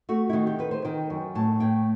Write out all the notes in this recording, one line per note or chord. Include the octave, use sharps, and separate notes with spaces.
A3 F#4
E4
D#3 F#4
G4
D#3 B4
C5
D#3 G5
F#2
A2 A5
A2 G5